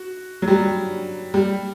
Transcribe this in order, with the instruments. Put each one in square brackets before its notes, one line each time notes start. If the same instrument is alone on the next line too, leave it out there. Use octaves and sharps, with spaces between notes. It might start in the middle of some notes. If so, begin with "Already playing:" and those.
Already playing: [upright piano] F#4
F#3
G3
G3